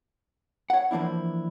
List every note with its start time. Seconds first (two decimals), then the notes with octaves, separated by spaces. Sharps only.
0.70 C#5 F#5
0.91 E3 F3 A#3 D4 E4